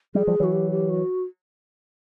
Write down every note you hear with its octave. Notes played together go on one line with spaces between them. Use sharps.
F3 G3 G#4
F3 G3
E3 F#3 F#4
G4
G4
F#4